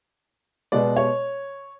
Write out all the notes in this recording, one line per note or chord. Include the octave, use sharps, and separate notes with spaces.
B2 G#3 B3 D5
C#5